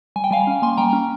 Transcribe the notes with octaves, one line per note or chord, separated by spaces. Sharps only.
G3 G#5
G5
G3 F5 G#5
C#4
A#3 G#5 C6
G3 G5 A#5
C#4